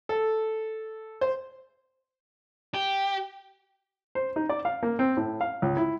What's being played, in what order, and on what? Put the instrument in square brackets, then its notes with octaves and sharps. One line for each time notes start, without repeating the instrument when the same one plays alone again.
[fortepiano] A4
C5
[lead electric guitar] G4
[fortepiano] C5
D#4
D5
F5
A#3
C4
A2
F5
C#2
E4